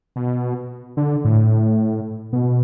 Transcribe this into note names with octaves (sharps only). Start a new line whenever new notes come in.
B2
D3
A2
B2